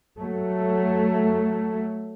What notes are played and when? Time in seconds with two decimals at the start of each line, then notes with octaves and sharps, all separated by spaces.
0.17 F#3 A3